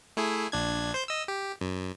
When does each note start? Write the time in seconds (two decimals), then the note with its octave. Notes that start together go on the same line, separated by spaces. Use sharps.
0.17 A3 E4 G#4
0.52 A#1 D4 G#6
0.94 C5 G6
1.08 D#5 E6
1.28 G4
1.61 F#2